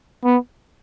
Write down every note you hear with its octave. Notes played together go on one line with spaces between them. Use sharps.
B3